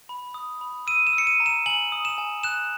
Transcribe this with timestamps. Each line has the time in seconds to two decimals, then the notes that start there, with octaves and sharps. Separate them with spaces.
0.09 B5
0.34 D#6
0.61 B5
0.87 E6 D#7
1.07 E7
1.13 E6
1.18 C#7
1.27 D#7
1.40 A#5
1.46 E7
1.66 G#5 F#7
1.92 D#6
2.05 E7
2.18 G#5
2.44 F#6 E7